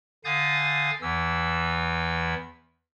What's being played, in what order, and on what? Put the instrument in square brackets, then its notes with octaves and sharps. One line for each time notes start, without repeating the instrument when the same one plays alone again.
[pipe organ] D3 F5 G#5 D#6 G6 A6
E2 E3 E6